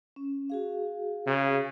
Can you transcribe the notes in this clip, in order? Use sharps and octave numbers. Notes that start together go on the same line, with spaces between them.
C#4
F#4 G#4 F5
C#3